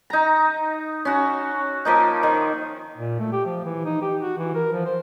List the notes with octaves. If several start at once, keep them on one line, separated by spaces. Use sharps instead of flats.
D#4 A#5
C#4 F#4
F3 A#3 D#4
D#3
A#2
A3
G4
F3
E3
D#4
G4
F#4
E3
A#4
F3
C5